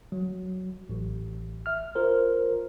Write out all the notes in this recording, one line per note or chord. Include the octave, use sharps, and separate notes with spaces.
F#3
A1
E5 F6
F4 A#4 C5